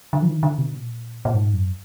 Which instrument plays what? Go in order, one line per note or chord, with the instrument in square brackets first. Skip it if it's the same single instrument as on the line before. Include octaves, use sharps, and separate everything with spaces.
[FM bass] D3
F3
D#3
D3
B2
A#2
A#2
G#2
F#2